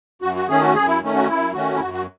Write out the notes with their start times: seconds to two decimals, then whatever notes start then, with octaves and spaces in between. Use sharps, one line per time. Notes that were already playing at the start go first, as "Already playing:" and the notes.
0.22 F#2 F#4
0.36 F#4
0.49 D#3 A3 C#4 G#4
0.62 F#4
0.74 F#2 G#4
0.88 E4
1.01 D#3 A3 C#4
1.14 F#4
1.27 F#2 E4
1.53 D#3 A3 C#4 F#4
1.76 E4
1.80 F#2 F#4
1.93 F#4